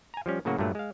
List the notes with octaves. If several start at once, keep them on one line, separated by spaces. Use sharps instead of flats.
G#5 A#5
F3 G3 C#4
A2 C#3 F#3 A#3 F#4
G2 A#2 F#3 A3
G#3 F5